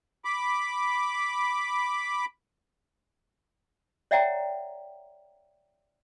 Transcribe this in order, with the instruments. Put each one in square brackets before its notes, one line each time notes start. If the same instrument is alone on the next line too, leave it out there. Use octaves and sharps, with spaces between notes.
[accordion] B5 D6
[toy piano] C#5 D5 E5 F#5 G5 A#5